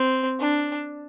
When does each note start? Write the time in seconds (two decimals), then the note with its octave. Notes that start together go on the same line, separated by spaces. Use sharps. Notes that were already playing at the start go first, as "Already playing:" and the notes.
Already playing: C4
0.40 D4